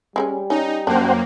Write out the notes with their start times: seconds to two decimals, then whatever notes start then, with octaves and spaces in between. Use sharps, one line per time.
0.16 G3 G#3 C4 C#4
0.50 C#4 D#4
0.87 F#2 A#3 D4 C5 F#5 G5